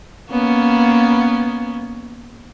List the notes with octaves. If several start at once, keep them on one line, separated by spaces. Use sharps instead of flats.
A#3 B3 C#4